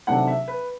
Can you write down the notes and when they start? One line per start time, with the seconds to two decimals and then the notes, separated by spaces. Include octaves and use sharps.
0.07 C3 D#3 F#3 A3 D4 F#5
0.27 E5
0.48 B4